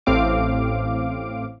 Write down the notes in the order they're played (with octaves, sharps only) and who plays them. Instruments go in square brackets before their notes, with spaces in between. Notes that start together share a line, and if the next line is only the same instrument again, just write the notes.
[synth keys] A1 A2 C4 F5 D6 D7